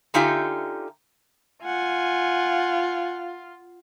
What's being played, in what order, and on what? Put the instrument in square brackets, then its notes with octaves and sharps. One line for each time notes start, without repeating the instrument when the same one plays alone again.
[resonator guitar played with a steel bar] D3 D#4 F4 G4 E5 G#5
[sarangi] F4 [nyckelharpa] F#5 G#5